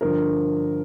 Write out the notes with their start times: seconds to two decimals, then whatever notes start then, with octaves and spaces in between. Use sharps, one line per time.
0.01 G2 D3 F3 A#4